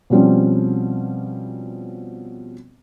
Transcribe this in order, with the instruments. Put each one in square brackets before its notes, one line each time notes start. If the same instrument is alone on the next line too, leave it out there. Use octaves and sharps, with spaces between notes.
[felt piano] B2 F3 G3 C4 C#4